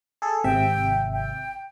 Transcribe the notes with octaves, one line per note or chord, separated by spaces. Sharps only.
G#4 A4
G#1 C3 E5 G5
G5